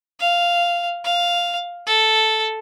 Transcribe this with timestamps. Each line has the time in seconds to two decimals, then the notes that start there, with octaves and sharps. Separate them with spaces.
0.19 F5
1.04 F5
1.86 A4